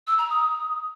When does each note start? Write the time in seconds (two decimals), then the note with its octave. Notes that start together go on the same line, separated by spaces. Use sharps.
0.07 E6
0.18 A#5
0.30 D#6